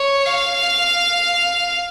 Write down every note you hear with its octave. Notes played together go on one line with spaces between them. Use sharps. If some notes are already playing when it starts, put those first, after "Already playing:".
Already playing: C#5
F5